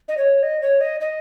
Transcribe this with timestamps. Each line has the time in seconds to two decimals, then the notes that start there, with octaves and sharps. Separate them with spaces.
0.09 D#5
0.17 C#5
0.43 D#5
0.62 C#5
0.81 D#5
1.01 D#5